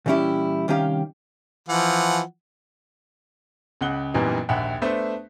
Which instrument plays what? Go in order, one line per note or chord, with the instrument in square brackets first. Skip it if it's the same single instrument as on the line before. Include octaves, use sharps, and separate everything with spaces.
[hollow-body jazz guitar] A#2 E3 G3 C#4 E4 G4
C2 D#3 C#4 G4 F5
[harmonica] E3 F3 F#5
[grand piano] C#2 C#3 F#5 F#6 G7
F#2 A#2 E3 G3 B3 D#4
A#1 D#2 E5 F#5 G5
A3 B3 D4 C5 E5